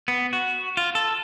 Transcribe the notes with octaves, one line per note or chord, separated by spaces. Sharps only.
B3
F#4
F4
A4